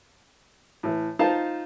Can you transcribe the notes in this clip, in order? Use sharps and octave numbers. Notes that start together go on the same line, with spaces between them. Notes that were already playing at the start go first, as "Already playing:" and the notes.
A2 E3
D#4 F4 C5 F5 A5